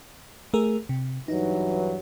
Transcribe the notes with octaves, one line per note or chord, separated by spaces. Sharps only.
A3 G#4 A#4
C3
G2 E3 F#3 D#4